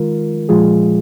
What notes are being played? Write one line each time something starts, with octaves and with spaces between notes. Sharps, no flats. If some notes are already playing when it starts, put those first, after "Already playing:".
Already playing: D#3 G#3 F4 A#4
A#2 F3 G#3 F4 G#4